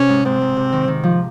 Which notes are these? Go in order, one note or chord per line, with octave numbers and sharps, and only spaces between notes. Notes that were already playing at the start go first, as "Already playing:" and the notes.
Already playing: C3 C#4
G#2
G#2 C4
G#2
C3
D#3
D#3
F3